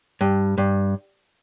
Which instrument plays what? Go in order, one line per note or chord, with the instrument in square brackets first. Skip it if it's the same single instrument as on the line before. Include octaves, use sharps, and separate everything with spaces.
[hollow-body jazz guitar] G2
G2